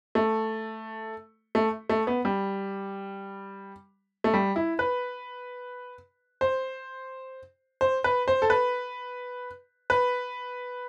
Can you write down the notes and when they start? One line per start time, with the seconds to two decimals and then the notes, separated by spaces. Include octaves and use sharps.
0.15 A3
1.55 A3
1.89 A3
2.07 B3
2.25 G3
4.24 A3
4.34 G3
4.56 E4
4.79 B4
6.41 C5
7.81 C5
8.04 B4
8.28 C5
8.42 A4
8.50 B4
9.90 B4